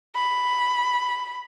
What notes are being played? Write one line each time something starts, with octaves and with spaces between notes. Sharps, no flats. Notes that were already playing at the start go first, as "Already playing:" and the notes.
B5